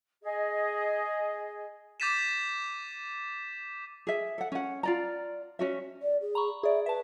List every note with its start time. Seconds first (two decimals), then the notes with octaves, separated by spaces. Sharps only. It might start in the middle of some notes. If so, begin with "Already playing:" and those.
0.23 G#4 D#5
2.00 D6 G6 A6 B6 D#7 E7
4.07 G#4 E5
4.38 A4 F#5
4.52 C#4 F#5
4.83 F4 D5 A#5
5.59 C#4 F#4 E5
6.02 D5
6.21 G#4
6.35 A#5 B5 C#6
6.63 G#4 D5 E5
6.86 B4 E5 A5